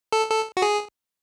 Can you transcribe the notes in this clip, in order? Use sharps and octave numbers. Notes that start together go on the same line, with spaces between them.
A4
A4
F#4
G#4